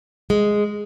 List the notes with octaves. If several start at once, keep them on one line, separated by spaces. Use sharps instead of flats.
G#3